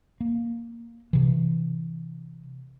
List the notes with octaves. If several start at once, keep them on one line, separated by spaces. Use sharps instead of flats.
A#3
C3 E3